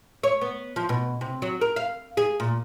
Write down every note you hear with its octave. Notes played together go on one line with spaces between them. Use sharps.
C#5
B3
F3
B2
C3
F#3
A#4
F5
G#4
A#2